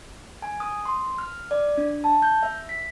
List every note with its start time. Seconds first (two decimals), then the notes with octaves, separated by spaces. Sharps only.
0.42 G#5
0.60 D#6
0.85 C6
1.18 F6
1.51 D5
1.77 D4
2.04 A5
2.22 G6
2.43 E5
2.69 B6